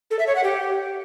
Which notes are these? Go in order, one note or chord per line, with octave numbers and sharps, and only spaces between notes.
A4
E5
C#5
F#5
G4